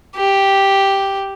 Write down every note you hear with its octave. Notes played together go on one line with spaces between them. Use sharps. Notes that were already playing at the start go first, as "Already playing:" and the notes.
G4